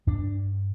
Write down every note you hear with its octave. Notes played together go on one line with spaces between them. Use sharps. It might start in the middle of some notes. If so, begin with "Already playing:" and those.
G2 D4